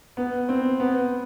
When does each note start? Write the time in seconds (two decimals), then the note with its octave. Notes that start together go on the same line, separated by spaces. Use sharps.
0.17 B3
0.49 C4
0.80 B3